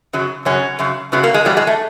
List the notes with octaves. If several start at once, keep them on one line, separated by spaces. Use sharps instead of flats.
F#2 C#3 F#3
F#2 C#3 F#3 C#4
F#2 C#3 F#3
F#2 C#3 F#3 B3
A#3
G#3
E2 B2 F#3 G3
G#3
A3